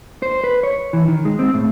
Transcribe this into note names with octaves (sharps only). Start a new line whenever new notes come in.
C5
B4
C#5
E3
D#3
G#3
C4
A2